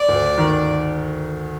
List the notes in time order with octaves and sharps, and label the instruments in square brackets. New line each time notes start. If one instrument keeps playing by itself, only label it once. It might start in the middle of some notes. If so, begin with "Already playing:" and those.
Already playing: [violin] D5
[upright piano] D2
D#3